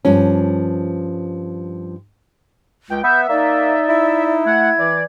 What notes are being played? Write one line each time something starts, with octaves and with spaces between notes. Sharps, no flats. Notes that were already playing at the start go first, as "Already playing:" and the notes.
G2 F3 C#4
C#2 G5
B3 B4 E5 G6
A#3 D#4 D5
E4
A3 F#5 G#6
E3 D5